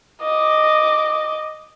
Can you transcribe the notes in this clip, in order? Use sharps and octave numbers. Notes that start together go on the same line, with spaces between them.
D#5 D6